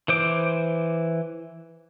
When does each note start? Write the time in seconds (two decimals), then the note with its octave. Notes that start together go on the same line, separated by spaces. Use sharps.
0.08 E3 C5 D6